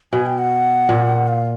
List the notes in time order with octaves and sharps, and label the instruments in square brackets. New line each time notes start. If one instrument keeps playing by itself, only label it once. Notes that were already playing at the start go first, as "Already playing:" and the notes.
[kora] B2 [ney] G#5
[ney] G5
F#5
[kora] A#2
[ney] F5